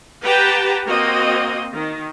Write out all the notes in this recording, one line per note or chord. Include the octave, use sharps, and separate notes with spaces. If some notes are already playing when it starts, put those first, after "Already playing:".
G4 B4 F#5 G5 A5 A#5
A#3 C4 F#4 D#5
D#3